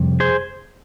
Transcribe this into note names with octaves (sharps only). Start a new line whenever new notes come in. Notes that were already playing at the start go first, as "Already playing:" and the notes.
Already playing: F2 C3 G3
G#4 C5